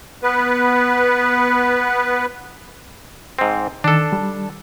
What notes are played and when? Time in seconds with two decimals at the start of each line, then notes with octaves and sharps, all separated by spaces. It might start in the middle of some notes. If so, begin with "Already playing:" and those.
0.23 B3 B4
3.39 G#2 C4
3.84 D#3 D4 A4
4.12 G3